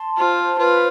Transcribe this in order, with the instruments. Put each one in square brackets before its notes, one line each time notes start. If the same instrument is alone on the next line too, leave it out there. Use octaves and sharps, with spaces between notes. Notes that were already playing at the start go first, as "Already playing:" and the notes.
Already playing: [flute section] A5 C6
[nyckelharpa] F4 [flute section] C5
[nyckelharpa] F4 [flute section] B4